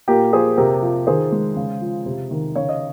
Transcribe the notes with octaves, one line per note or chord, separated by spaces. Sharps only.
A#2 G4 A#4
F3 G#4 C5
C3 G4 A#4
F3
D#3 G#4 C5
G#3
C#3
F3
C3
D#3
C#3 C#5
D#5